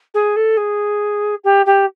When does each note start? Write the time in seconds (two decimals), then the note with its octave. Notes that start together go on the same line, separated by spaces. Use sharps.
0.14 G#4
0.36 A4
0.57 G#4
1.44 G4
1.66 G4